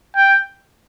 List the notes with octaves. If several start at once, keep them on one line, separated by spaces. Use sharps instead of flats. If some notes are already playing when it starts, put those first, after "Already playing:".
G5